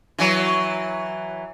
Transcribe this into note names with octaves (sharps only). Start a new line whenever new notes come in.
E3 F#3